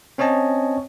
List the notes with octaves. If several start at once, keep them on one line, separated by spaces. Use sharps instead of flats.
C4 C#4 C#5 D#5 A5